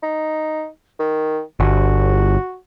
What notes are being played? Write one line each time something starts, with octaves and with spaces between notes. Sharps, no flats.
D#4
D#3
G1 F#4